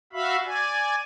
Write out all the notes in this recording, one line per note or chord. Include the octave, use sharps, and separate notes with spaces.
F#4 E5 F5 B5
D5 G#5